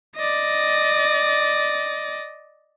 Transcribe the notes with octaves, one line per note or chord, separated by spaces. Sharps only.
D5 D#5